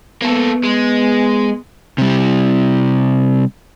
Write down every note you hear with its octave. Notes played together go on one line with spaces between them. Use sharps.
A#3 B3 A4
G#3
C3 G3